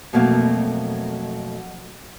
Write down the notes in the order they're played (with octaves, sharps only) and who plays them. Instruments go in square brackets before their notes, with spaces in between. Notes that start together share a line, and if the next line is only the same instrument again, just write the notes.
[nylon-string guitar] F2 B2 F#3 A3 A#3